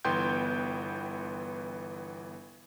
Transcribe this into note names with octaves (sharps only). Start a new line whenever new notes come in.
G1 E3 B3 G5 C6 G6